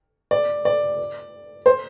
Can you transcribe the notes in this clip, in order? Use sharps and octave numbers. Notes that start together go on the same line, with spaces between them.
D5
D5
C5